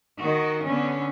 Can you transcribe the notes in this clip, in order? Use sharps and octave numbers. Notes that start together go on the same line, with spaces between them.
D#3 F#4 D#5
D3 B3 C#4